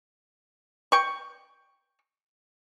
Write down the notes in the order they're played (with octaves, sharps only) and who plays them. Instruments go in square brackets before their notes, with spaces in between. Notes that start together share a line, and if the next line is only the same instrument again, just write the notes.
[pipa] G5 C#6